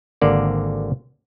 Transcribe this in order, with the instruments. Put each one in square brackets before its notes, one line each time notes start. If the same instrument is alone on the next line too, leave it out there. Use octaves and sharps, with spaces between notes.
[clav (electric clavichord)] G#1 D3 A#3 D5